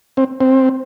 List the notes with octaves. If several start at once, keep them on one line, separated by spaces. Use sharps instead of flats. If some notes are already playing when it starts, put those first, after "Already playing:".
C4
C4